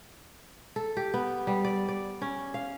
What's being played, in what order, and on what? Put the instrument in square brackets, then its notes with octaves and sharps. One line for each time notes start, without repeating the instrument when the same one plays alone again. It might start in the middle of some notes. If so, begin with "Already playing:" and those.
[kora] A4
G4
B3
G3
D5
D5
C#4
F5